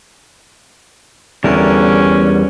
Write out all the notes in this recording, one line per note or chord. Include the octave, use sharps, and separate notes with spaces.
E2 D3 G3 C#4 A#4